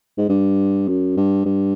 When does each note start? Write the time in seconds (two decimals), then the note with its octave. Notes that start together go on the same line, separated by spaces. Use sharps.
0.18 G#2
0.29 G2
0.88 F#2
1.17 G2
1.46 G2